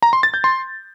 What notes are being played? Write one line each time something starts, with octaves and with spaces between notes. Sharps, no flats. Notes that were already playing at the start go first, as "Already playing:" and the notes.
A#5
C6
A6
G6
C6